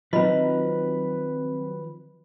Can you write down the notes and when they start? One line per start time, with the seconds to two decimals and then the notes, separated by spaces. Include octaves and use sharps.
0.13 D#3 F3 F#3 C4 B4 D#5 A#5 B5